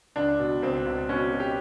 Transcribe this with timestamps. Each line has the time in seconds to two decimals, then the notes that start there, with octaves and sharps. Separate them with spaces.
0.16 C#2 D4
0.39 B2
0.62 C#2 C4
0.86 C#2
1.09 B2 C#4
1.32 B2
1.40 G4